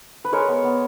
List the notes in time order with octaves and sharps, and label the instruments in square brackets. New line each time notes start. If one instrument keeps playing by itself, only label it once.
[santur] B4
G#3 A#4 C#5
B3
B3